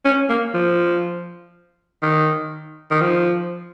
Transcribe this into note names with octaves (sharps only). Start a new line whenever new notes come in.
C#4
A#3
F3
D#3
D#3
F3